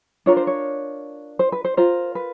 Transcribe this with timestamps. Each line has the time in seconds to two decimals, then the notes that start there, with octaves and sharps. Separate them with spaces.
0.26 D4 F4 A#4 C#5
0.37 C5
0.47 C#5
1.39 C5
1.52 B4
1.65 C5
1.77 F4 A#4 C5
2.15 B4